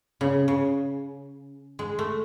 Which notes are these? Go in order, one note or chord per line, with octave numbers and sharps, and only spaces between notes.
C#3
C#3
G#3
A3